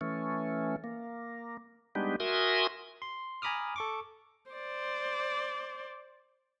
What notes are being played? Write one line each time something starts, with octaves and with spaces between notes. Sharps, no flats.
E3 A3 C#4
A#3
G3 G#3 B3 D4 D#4 G4
F#4 A#4 E5 G#5 C6 D#6
C6
G#5 A#5 B5 D6 D#6 F6
A4 C#6 D6
C5 D5